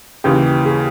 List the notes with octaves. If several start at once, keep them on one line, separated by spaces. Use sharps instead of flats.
D#2 C#3 E3 G4
G#4